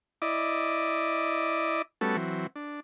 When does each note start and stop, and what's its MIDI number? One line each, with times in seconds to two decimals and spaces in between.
0.22 1.82 64
0.22 1.82 74
0.22 1.82 75
0.22 1.82 86
2.01 2.17 55
2.01 2.17 57
2.01 2.17 59
2.01 2.17 61
2.01 2.17 66
2.01 2.17 69
2.17 2.47 52
2.17 2.47 54
2.17 2.47 60
2.56 2.80 62